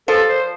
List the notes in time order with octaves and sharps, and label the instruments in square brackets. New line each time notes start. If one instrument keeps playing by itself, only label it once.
[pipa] F3 [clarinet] A4
[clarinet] C5